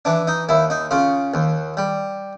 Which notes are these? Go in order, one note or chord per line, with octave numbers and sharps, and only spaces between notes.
E3 D4
D#4
D#2 E4
D#4
C#3 F4
D#2
G3